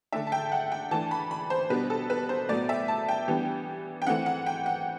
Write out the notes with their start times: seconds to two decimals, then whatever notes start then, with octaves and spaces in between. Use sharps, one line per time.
0.12 D3 A3 D4 E5
0.27 A5
0.32 G5
0.52 F#5
0.72 G5
0.91 E3 A3 D4 A5
1.11 B5
1.31 B5
1.50 C5
1.70 B2 G3 B3 D4 B4
1.90 A4
2.10 B4
2.29 C5
2.49 A2 F#3 B3 D5
2.69 E5
2.88 A5
3.09 G5
3.28 E3 G3 B3 D4
4.02 G5
4.07 E3 A3 C4 F#5
4.26 F#5
4.46 G5
4.66 F#5